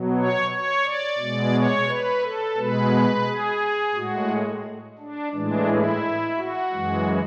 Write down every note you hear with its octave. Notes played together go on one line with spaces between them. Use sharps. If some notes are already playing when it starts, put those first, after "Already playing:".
Already playing: B2 F#3
C#5
C#5
D5
B2 G#3
C#5
B4
A4
B2 G#3 B4
G#4
A2 G#3 F#4
D4
A2 E3 G#3 D4
E4
F#4
F#2 E3 G#3